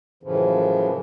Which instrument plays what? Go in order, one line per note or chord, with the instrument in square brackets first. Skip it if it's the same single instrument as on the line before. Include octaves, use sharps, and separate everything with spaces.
[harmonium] F#2 A2 C#3 E3 F3